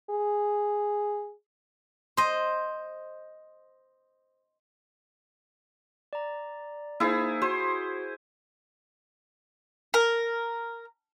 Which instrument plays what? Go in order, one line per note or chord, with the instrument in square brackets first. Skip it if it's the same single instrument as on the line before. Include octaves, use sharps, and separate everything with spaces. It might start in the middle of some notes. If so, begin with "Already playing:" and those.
[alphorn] G#4
[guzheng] C5 D#5
[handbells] D5 A#5
[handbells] A#3 D#4 C5 [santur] E4 G#4
[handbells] F#4 [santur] C5
[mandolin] A#4